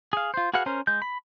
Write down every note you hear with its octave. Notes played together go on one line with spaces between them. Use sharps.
G#4 F5
F4 C5
F#4 G#4 B4 F5 F#5
C#4 A#4 C5
G#3 G6
B5